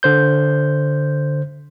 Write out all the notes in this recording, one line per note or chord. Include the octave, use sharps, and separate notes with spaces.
D3 C5 G6